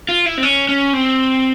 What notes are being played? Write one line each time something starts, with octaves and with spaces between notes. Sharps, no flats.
F4
E4
C4
C#4
C#4
C4